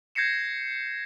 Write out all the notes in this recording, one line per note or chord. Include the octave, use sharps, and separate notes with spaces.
G6 G#6 A#6 C7 C#7 E7